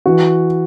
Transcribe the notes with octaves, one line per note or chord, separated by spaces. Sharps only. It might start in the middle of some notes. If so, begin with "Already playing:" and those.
E3 F#4